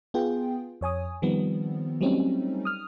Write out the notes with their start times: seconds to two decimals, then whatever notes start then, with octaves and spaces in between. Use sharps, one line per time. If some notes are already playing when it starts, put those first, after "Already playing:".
0.14 B3 F4 G#4 G5
0.81 F2 C#5 G#5 D#6
1.22 D#3 F3 G3 B3 C4
2.01 F#3 G3 A3 C4 C#4 D#4
2.65 D#6 F6